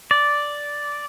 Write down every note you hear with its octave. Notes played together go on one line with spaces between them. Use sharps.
D5